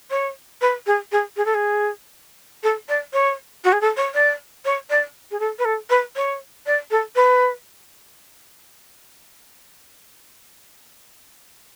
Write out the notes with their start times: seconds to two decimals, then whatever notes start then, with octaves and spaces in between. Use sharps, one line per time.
0.10 C#5
0.61 B4
0.86 G#4
1.12 G#4
1.37 G#4
1.45 A4
1.54 G#4
2.63 A4
2.88 D5
3.13 C#5
3.64 F#4
3.72 G#4
3.81 A4
3.96 C#5
4.14 D5
4.65 C#5
4.89 D5
5.31 G#4
5.39 A4
5.59 B4
5.65 A4
5.90 B4
6.16 C#5
6.66 D5
6.91 A4
7.15 B4